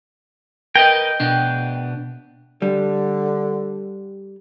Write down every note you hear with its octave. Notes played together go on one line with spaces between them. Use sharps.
A#4 B4 D#5 G5
B2 B3 D4
D3 G3